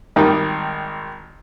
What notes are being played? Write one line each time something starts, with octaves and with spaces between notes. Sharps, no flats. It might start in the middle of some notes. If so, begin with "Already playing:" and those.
G#1 G3 A#3 D#4